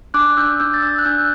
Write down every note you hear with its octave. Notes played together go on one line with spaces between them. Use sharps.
D4 D6 F#6
D4 E6 G6
D4 E6 G6
A6
D4 E6 G6
F#6
D4 E6 G6